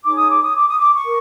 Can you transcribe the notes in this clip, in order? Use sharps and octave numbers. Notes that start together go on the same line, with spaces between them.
D#4 G#4 C#5 D6
D#6
D6
D#6
D6
D#6
D6
C#6
A#4